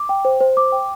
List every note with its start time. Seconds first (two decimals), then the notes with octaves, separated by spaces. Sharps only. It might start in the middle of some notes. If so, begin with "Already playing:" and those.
Already playing: D6
0.09 G5
0.25 C5
0.41 C5
0.57 D6
0.72 G5